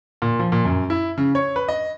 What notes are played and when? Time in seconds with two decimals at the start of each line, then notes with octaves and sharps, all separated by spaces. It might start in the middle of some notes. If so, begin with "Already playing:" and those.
0.22 A#2
0.39 F3
0.52 A#2
0.65 F#2
0.90 E4
1.17 C#3
1.35 C#5
1.56 B4
1.68 D#5